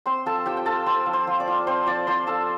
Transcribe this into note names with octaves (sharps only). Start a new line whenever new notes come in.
C4 C5 C6
F3 A4 A5
F3 G4 G5
G5
F4 A4 A5
C4 C5 C6
F3
C5 C6
F3
D5 D6
F4
C4 C5 C6
F3 D5 D6
F3 C5 C6
F4 A4 A5